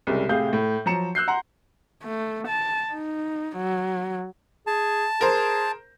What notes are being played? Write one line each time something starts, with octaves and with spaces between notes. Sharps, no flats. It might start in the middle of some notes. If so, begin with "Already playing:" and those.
C2 C#3 G3 G#3
A2 C3 A3 G#4 F5 G6
A2
F3 F#3 A#5 C#7 E7
E6 F#6 G6 C7
F#5 A#5 C6
A3
A5
D#4
F#3
G#4 A5
G#4 A#4 C5